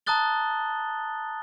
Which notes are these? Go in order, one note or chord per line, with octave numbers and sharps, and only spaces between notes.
A5 A#5 D#6 F#6 A6 G7